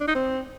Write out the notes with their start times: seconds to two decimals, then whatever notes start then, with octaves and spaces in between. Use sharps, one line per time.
0.01 D4
0.08 D#4
0.15 C4